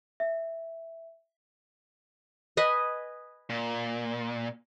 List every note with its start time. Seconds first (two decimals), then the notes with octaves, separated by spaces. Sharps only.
0.20 E5
2.57 B4 D#5 G#5
3.50 A#2